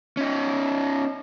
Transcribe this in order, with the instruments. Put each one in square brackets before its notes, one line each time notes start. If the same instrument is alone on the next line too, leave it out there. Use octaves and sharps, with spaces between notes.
[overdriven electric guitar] C#4 D#4